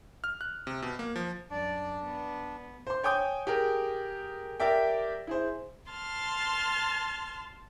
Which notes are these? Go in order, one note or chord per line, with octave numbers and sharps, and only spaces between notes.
F6
F#6
C3
B2
A#3
F3
F#2 D4 D5
B3
C5 C6
C#5 G5 G#5 D#6 G6
G4 G#4 A#4
G4 A#4 D5 E5 G5
E4 G#4 C5
A5 C6 F6